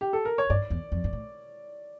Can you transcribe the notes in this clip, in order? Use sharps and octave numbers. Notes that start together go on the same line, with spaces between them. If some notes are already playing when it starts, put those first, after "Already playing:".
G4
A4
A#4
C#5
G2 D5
E2
F2
G2
A2